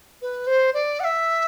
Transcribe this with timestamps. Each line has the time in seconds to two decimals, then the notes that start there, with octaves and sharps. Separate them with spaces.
0.21 B4
0.46 C5
0.73 D5
0.99 F#5
1.04 E5